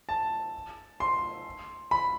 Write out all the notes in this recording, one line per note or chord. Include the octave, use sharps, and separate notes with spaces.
A5
C6
B5